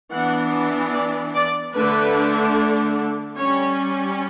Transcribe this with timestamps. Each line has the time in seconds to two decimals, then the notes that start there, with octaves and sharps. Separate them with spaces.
0.12 E3 B3 D4 F#5
0.93 D5
1.34 D5
1.74 D3 A3 D4 B4
3.37 G3 C#4 C#5